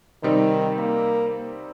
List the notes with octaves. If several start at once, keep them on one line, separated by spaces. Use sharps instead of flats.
C3 D#3 G3 C4 D#4
A#3